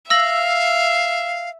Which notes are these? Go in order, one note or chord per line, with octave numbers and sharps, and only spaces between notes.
E5 F5 E6 A#6 F#7